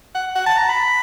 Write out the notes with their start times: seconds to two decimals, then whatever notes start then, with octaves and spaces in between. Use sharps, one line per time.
0.15 F#5
0.36 F#5
0.47 A5
0.58 A#5
0.69 B5